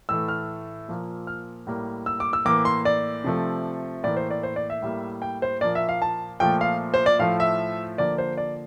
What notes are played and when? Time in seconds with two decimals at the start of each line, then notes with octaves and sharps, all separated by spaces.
0.09 A2 E3 A3 E6
0.28 F6
0.89 A#2 F3 A#3
1.27 F6
1.67 A2 G3 A#3
2.06 E6
2.20 D6
2.33 E6
2.45 A2 E3 A#3 D6
2.65 C6
2.85 D5
3.24 C3 F3 A3
4.04 A2 E3 A#3 D5
4.17 C5
4.31 D5
4.43 C5
4.56 D5
4.70 E5
4.83 A2 G3 A#3
5.22 G5
5.42 C5
5.61 A#2 F3 A#3 D5
5.75 E5
5.89 F5
6.02 A5
6.40 A#2 F3 A3 G5
6.61 F5
6.94 C5
7.06 D5
7.19 A2 F3 A3 F5
7.40 E5
7.98 D3 F3 A#3 D5
8.18 C5
8.37 D5